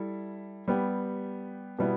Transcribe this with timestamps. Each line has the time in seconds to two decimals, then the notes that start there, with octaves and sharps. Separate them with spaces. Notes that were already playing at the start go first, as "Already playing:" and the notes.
Already playing: G3 E4 A4
0.68 G3 B3 G4
1.79 B2 G3 B3 E4